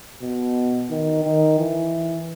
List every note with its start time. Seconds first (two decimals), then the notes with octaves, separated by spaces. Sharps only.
0.22 B2
0.90 D#3
1.24 D#3
1.59 E3